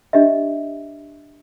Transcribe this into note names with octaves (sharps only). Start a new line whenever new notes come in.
D4 G4 D#5 E5